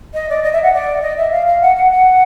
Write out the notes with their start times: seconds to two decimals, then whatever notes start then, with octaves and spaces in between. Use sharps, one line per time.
0.14 D#5
0.29 D5
0.43 D#5
0.53 E5
0.63 F#5
0.73 D5
1.02 D#5
1.17 E5
1.32 F5
1.46 F5
1.61 F#5
1.76 F#5
1.90 F#5